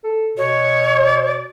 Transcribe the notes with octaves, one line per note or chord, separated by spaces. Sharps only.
A4
B2 C#5